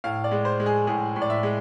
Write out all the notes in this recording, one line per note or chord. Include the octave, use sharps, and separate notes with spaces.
A2 F5
D5
G#3
C5
G#3
G#4
A2 G#4
A2
D5
E5
G#3